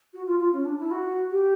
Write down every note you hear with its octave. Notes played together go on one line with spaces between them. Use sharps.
F#4
F4
F4
C#4
D4
E4
F#4
G4